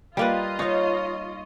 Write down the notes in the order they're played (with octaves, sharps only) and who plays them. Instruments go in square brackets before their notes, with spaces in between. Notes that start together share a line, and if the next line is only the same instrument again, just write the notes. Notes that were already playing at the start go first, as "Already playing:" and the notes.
[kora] G3 A#3 B4 [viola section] F4 D#5
[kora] D#4 F5 [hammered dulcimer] C#5